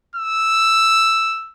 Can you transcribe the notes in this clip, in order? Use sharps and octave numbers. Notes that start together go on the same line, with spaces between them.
E6